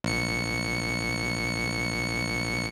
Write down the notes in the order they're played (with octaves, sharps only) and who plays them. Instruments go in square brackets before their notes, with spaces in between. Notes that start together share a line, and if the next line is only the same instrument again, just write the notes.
[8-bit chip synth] A#1 C#7